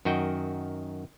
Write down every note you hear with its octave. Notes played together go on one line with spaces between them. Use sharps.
F#2 D#3 F#4 D#5 G5